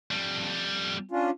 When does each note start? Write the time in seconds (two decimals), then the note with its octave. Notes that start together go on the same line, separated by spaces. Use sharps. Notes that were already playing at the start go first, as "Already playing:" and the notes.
0.11 F2 G3
1.11 C#4 D4 F4